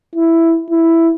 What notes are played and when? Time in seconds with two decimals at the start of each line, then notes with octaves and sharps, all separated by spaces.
0.15 E4
0.70 E4